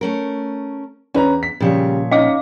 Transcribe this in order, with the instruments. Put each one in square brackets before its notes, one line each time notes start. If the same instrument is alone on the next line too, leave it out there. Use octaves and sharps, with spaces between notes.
[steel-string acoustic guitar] A3 C#4 A#4
[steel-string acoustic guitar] E2 [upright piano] C#4 B4 A#5
[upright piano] B6
[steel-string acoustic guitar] A#2 F3 C#5 [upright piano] C#3 G3
[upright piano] C#4 D#4 [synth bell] D#5 F5 D6